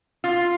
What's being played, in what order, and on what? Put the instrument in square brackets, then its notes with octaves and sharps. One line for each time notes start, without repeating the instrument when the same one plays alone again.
[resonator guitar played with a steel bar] F4